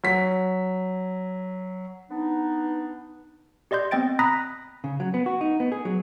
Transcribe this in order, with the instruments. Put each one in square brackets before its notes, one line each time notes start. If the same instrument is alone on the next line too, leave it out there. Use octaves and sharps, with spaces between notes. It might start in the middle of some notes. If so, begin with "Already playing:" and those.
[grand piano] F#3 B6
[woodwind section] B3 D4 D#4
[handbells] G4 D5 D#5 C6 G6
B3 C4 D#5 G5 A6 D7
A#5 B5 D#6 F#6 A#6 B6
[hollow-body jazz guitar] C#3
F#3
B3
F#4
D#4
B3
G#4
F#3